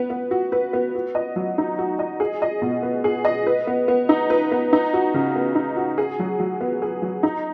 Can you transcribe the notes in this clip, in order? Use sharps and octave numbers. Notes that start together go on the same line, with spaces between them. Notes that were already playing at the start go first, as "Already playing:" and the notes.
Already playing: B3 B4
B3
F#4
B4
B3
F#4
D#5
F#3
D#4
F#4
D#5
G#4
D#5
B2
B3
G#4
D#5
B4
B3
B3
D#4
B4
B3
D#4
F#4
C#3
B3
D#4
F#4
G#4
F#3
F#3
B3
G#4
F#3
D#4